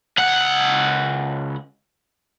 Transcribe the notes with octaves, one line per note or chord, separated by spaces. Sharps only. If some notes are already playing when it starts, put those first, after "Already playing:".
C#2 F#5